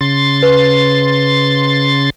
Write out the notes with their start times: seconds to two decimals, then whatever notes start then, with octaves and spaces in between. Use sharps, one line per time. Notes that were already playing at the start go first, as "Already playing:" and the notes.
0.01 C#3 C6 A6
0.43 B4